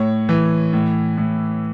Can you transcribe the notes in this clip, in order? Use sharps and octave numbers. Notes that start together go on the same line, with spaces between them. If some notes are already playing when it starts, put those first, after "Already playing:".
Already playing: A2 C#5
E3
A2
A2